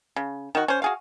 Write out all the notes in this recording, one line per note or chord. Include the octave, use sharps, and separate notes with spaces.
C#3
D#3 F#4
C#4 C5
F#4 G#4 F5